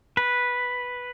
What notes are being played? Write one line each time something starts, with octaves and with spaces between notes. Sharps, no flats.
B4